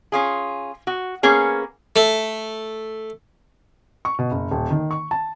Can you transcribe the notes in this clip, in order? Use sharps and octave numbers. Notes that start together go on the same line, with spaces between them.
C#4 F4 G#4
F#4
A#3 B3 C#4 G#4
A3
C#6
B2
F#1
D#1
D#3
C#6
A5